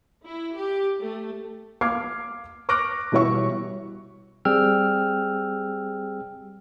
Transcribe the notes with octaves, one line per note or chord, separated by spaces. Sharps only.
E4
G4
A3
F5 D6 F6 G#6 C7
C#6 D6 F6 F#6 A#6 D7
B2 E3 G3 C#5 E5 C#6
G3 C4 G#4 G5 E6 F6